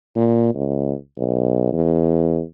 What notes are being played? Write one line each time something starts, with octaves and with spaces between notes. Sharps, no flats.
A#2
C#2
B1
E2